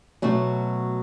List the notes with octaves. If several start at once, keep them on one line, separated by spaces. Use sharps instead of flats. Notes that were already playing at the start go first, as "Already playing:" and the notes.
B2 F#3 A3